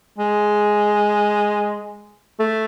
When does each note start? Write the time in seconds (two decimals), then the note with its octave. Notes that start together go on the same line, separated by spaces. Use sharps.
0.18 G#3
2.39 A3